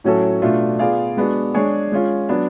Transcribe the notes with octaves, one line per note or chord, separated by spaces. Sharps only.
A2 F#3 C#4 F#4 A4
B2 A3 D4 F4
B3 F4 G#4 D5 F5
G#3 B3 D4 F#4
G#3 D4 G#4 C#5
G#3 C#4 F4
F#3 B3 D4